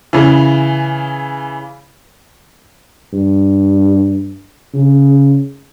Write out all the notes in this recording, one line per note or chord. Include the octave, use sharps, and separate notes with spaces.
C#3 E3
G2
C#3